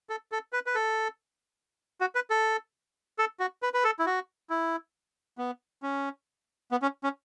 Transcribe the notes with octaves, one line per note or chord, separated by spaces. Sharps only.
A4
A4
B4
B4
A4
F#4
B4
A4
A4
F#4
B4
B4
A4
E4
F#4
E4
B3
C#4
B3
C#4
C#4